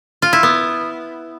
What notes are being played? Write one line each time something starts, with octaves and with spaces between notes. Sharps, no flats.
F4
E4
B3